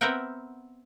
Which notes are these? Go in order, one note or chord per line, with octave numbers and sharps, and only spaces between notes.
B3 C4 A#4 E5 F#5 G5